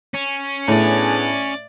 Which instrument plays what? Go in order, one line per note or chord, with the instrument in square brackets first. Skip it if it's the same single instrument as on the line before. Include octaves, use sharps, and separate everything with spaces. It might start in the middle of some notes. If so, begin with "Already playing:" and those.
[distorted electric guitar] C#4
[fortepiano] A2 [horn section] B3 D4 G#4 [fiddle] D5